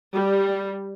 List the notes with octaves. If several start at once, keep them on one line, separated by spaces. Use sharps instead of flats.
G3